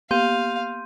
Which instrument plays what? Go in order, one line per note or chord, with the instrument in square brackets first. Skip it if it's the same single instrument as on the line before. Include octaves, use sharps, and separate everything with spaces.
[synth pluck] A#3 B3 G4 [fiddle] F5 [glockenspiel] C6 G6 D#7